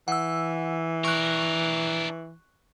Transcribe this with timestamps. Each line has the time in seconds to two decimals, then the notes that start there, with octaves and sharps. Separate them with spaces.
0.08 E3 F#5 E6
1.05 D4 A#4 C#6 F#6